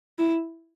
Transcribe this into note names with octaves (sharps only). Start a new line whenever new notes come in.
E4